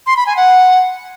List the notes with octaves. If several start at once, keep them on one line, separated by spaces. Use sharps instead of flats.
C6
B5
G#5
F#5